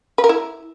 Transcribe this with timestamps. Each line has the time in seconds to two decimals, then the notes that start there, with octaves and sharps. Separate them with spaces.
0.18 B4
0.24 A#4
0.29 E4